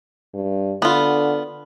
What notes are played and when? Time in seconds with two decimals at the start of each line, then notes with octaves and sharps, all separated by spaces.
0.34 G2
0.82 D3 B3 F4